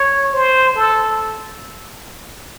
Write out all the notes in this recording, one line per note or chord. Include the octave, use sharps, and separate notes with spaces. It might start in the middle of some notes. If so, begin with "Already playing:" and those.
Already playing: C#5
C5
A4